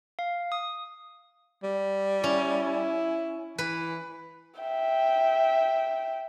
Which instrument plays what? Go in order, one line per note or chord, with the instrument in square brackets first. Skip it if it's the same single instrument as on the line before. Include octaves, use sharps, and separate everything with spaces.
[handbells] F5
D#6
[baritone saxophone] G3
[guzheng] C#4 [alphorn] E4
[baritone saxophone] E3 [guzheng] B4
[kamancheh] E5 G5